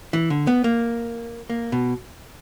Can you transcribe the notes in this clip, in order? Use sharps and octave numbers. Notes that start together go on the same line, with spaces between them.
E3
D3
B3
A#3
A#3
B2